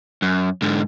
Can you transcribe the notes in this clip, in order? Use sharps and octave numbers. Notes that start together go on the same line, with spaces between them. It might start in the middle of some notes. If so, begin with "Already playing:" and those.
F#2
G#2 D3